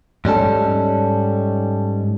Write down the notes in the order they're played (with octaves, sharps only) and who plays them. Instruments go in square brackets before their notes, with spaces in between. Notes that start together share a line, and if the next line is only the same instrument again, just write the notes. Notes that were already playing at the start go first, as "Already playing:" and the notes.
[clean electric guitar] G#2 G3 C#4 A4